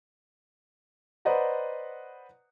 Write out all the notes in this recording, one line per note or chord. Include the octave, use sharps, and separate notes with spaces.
B4 C5 D5 D#5 F#5 A#5